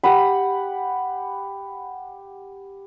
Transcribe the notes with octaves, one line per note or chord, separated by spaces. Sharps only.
G4 F#5 B5